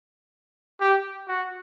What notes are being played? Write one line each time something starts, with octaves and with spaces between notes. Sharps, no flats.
G4
F#4